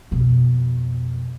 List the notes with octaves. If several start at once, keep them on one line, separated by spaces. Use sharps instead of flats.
F2 B2